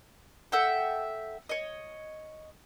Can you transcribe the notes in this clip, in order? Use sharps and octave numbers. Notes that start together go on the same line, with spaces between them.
A4 E5 F#5 G5
C#5 D#5